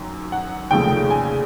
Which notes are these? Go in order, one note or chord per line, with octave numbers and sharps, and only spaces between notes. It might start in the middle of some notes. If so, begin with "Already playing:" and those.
Already playing: F#2 D#3 F#3
F#5
F1 D#2 C#3 F3 A3 G5
G#5